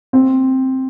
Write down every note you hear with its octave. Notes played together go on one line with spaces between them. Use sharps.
C4